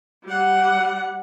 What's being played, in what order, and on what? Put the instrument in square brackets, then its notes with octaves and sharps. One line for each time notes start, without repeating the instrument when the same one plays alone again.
[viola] G3 F#5